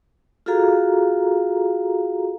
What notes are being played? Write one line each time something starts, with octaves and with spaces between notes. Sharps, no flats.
F4 F#4 G#4 A4 F5 A#5